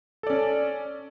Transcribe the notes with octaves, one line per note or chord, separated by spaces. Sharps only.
C#4 A4 D5